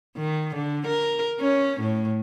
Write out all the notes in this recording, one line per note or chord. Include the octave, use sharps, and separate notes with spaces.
D#3
D3
A#4
C#4
A2